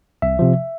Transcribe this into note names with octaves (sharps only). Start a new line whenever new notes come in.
C2 E5
C3 F3